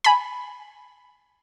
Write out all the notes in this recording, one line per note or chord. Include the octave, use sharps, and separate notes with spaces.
G#5 B5